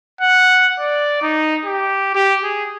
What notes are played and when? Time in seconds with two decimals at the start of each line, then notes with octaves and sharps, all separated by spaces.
0.21 F#5
0.79 D5
1.22 D#4
1.65 G4
2.15 G4
2.44 G#4